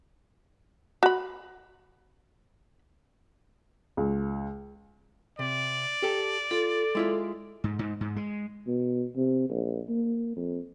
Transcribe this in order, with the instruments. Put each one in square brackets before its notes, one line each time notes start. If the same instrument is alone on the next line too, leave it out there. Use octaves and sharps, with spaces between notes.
[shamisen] F#4 B5
[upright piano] C#2
[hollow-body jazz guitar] C3 [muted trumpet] D5
[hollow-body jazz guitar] G4 A4
[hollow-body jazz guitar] F4 [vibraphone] A4
[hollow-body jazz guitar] G#3 E4 F4
[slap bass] G#2
G#2
G#2
G#3
[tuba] B2
C3
A#1
A#3
F2